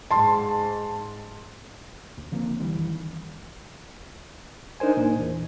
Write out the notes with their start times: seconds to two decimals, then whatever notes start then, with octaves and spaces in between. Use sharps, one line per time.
0.11 G#2 A5 C6
2.17 D2
2.32 D3 F3 A#3 C4
2.60 F1 D#3 E3 G3
4.80 D4 D#4 A#4 C5 G#5
4.97 A#2
5.19 E2